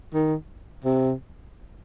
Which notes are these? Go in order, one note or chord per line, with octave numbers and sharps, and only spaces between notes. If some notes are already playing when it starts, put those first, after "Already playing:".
D#3
C3